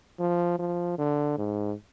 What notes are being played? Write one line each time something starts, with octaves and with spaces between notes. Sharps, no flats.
F3
F3
D3
G#2